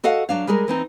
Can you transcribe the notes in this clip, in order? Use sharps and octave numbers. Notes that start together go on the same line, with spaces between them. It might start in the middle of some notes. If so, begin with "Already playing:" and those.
F#4 A4 D#5 F5 F#5
F#3 D4 F5
G3 G#3 G#4 A#4
E3 C4 D#4